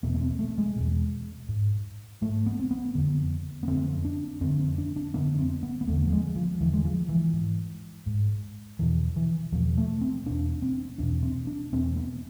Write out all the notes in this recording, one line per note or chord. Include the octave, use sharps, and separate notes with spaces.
E2 B2 B3
B3
C4
A3
G#3
E2 B2
G#2
G#2 A3
B3
C4
B3
F2 D3
B3
F2 D3 C4
D4
F2 D3 C4
C4
D4
D4
F2 D3 B3
C4
B3
B3
E2 D3 A3
F3
G#3
F3
E2 D3 E3
G#3
F3
E3
G#2
G#2
E2 B2 E3
E3
E2 B2 F3
A3
C4
E2 B2 D4
C4
E2 B2 D4
C4
D4
E2 B2 C4
B3